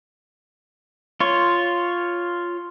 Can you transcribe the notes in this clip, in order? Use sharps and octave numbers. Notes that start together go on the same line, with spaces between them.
F4 C#5